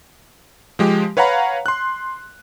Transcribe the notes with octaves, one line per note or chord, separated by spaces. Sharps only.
F3 G#3 G4
B4 C#5 F5 F#5 A#5 B5
C6 F#6